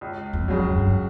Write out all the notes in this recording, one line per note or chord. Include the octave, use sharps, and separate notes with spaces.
C#2
F2
C#3 F#3
F#2
G2
F#2